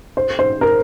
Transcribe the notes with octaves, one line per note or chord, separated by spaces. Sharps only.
C5
C5
A#4